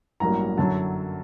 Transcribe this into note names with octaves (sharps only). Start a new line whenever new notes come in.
A1 G2 F#3 A#3 A#5
F#2 D3 F#3 A5